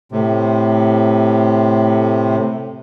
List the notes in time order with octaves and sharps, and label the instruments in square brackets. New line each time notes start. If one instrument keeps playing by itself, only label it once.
[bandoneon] A2 C3